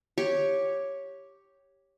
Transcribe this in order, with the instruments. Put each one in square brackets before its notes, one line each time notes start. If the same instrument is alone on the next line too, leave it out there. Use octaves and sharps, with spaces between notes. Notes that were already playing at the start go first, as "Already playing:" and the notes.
[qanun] G4 C#5